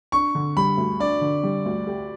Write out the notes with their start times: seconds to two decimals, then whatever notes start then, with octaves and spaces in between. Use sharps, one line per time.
0.12 D4 C#6
0.35 D3
0.57 G3 B5
0.77 D2
1.00 D4 D5
1.21 D3
1.43 G3
1.66 D2
1.87 G4